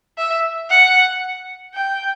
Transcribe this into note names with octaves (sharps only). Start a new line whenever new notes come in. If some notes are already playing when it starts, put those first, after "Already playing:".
E5
F#5
G5